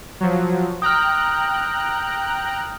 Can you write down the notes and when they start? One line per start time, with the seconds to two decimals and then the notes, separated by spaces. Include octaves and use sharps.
0.20 F3 F#3
0.82 G5 A#5 D#6 F6 F#6